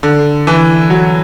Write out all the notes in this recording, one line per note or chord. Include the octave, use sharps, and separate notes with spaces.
D3
E3
F#3